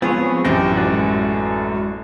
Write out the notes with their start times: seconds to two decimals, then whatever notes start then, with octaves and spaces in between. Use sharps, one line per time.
0.02 F3 G#3 B3 C4 F4 G#4 C#5
0.45 A1 F#2 E3 C#4 G4 G5 A#6
0.77 G#3 A3 F#4 B4 D5